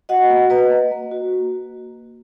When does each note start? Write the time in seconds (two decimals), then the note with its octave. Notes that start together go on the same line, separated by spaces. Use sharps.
0.09 F#4 D#5 F#5
0.30 A#3
0.50 A#3 B4 D#5
0.71 A#3
0.91 A#3
1.12 F#4